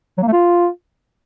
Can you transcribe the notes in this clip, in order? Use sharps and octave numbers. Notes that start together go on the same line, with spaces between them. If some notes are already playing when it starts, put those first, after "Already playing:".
F#3
A#3
A3
F4